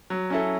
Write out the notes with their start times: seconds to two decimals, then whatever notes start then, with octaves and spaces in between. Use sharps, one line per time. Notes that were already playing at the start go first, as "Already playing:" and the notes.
0.10 F#3
0.30 C#4 E4 A4